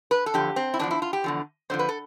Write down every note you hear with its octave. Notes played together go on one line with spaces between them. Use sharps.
B4
A4
E2 D3 F3 G4
C4
E4
E2 D3 F3 D4
E4
F4
G4
E2 D3 F3
F2 D3 F3 C5
B4
A4